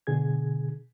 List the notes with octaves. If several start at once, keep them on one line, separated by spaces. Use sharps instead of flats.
B2 D3 G#4 G#6